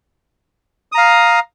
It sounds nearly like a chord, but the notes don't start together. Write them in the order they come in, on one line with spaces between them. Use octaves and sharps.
D#6 A#5 F5